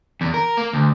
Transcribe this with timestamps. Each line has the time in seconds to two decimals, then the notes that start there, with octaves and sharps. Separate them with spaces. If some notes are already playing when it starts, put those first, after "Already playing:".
0.21 E2
0.34 A#4
0.57 A#3
0.73 D2